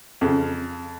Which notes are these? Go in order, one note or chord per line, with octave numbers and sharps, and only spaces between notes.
F2 C#3